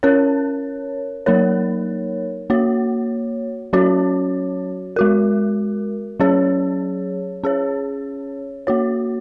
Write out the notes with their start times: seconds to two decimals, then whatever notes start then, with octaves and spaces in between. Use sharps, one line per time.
0.03 C#4 A#4 C#5
1.26 F#3 A#3 D#4 A#4 C#5
2.50 A#3 F#4 C#5
3.73 F#3 C#4 F#4 C#5
4.96 G#3 F#4 A#4
6.20 F#3 C#4 G#4 C#5
7.44 C#4 G#4 C#5
8.67 A#3 F#4 C#5